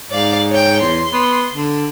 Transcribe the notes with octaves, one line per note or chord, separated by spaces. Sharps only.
G#2 D5 F5
C#5 G5
E2 C6
B3
D3